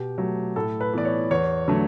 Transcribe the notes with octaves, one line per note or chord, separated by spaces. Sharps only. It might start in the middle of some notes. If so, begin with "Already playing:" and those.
Already playing: B2 G4
F#3 A3
A2 A4
B4
E3 B3 D5
C#5
E2 C#5
D3 F#3 A3